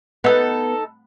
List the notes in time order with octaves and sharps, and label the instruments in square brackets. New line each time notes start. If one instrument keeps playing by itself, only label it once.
[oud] B3 [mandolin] D#4 A4